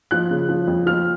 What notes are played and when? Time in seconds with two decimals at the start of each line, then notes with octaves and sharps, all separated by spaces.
0.11 F3 F#6
0.30 C#3
0.49 F3
0.67 F2
0.86 F3 F6